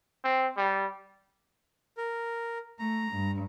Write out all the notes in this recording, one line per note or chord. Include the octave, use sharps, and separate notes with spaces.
C4
G3
A#4
A3 A#5
G2